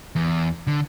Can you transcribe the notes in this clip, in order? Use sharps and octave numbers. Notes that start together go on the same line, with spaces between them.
E2
D3